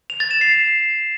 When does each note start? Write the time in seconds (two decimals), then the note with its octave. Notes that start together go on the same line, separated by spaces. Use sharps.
0.10 F7
0.20 A6
0.31 E7
0.41 C7